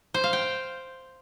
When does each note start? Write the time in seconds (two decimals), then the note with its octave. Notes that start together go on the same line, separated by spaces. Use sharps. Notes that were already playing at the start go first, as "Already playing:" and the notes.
0.14 C5
0.24 F5
0.33 G5